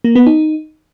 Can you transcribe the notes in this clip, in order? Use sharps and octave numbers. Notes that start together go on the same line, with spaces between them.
A#3
B3
D#4